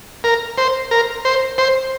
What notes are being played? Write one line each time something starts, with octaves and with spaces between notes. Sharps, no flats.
A#4
C5
A#4
C5
C5